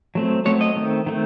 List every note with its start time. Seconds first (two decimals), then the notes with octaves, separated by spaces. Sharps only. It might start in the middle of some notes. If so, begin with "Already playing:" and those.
0.15 F#3 A3 C4
0.45 F#3 A3 C4 C#5
0.61 D#5
0.76 D#3 A3 C4
1.06 D#3 A3 C4